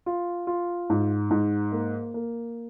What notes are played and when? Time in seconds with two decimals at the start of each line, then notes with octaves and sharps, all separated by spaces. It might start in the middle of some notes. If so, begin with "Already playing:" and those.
0.06 F4
0.47 F4
0.90 G#2
1.31 G#2
1.72 A#3
2.14 A#3